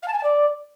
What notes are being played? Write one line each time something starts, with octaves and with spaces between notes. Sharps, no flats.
F5
A5
G#5
A5
D5